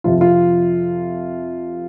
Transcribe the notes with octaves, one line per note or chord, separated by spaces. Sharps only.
F2 C3 F3 F4
F4